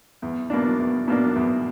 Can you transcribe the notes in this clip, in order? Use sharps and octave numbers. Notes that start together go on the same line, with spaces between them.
E2
B2 A#3 D4
E2
B2 A#3 D4
E2